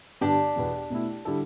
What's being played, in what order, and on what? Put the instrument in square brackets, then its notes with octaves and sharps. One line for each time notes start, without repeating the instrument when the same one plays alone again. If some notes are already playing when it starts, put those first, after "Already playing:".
[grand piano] G2 D3 B3 [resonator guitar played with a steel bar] D4 G4
[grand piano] E2 B2 B3
B2 A3 E4
D3 G3 E4 A4